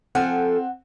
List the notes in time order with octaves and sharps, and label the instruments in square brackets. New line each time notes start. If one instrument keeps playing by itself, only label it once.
[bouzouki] F3 A4 G#5 [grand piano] C4 [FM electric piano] F#5